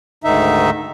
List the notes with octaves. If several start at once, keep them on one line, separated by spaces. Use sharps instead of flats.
D2 G#2 D#3 D#4 E5